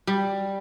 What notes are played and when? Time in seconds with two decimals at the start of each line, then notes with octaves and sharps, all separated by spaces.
0.07 G3